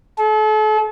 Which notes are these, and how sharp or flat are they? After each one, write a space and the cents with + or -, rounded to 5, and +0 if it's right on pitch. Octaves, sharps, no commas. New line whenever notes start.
A4 -40